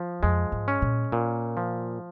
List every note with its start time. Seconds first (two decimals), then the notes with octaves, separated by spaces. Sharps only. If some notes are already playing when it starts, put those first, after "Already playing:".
Already playing: F3
0.23 F2 G#3
0.52 G#2
0.68 C#4
0.82 A#2
1.12 A#2
1.57 F3